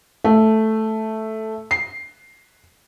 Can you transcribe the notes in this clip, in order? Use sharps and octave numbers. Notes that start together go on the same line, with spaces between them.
A3
C7